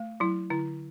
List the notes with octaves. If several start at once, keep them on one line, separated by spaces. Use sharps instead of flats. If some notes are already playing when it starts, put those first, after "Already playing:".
Already playing: A3
F#3 E4
D3 E4